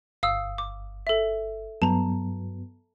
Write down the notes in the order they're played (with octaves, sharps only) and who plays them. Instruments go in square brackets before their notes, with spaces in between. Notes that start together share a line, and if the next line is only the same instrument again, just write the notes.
[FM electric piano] G1 [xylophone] F5 D#6 E6
[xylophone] D6
A4 E5
[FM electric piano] G2 F#3 B3 [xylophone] A5 A#5